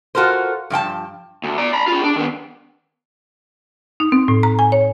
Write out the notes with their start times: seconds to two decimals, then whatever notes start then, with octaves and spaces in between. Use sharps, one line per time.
0.15 F4 F#4 A4 A#4 C5
0.70 G2 F3 G5 A5
1.43 D2
1.58 D5 A#5
1.73 A#5 B5
1.88 F4 G#4
2.04 D4
2.16 D#3 B3
4.00 D#4
4.12 C4
4.28 A2
4.43 A#5
4.59 G#5
4.72 C#5